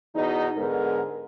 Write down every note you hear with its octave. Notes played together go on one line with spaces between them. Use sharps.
E2 B2 D#4
G#2 D3 B3 A#4